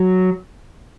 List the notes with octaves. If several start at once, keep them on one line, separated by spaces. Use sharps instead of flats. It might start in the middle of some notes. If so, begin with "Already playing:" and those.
Already playing: F#3